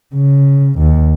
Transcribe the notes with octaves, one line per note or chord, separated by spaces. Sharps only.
C#3
D#2